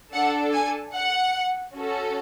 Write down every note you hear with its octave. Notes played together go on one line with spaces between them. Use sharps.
D4 A4 F#5
G#5
F#5
C#4 F#4 A4